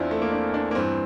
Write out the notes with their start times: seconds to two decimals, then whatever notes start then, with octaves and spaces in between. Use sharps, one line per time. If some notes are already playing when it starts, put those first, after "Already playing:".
Already playing: E2 C4 D4 E4 F4
0.11 A3
0.22 A#3
0.28 C4
0.32 D4
0.54 D4
0.71 A#3
0.75 G2 E3 C4